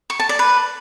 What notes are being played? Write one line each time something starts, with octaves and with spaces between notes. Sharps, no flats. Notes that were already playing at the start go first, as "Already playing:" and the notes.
C#6
A5
D5
B4